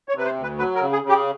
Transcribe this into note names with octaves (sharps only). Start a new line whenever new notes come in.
C#5
C3 B4
C5
D2
B4
F#3 B4
A#4
C#3
G#4
C#3
G4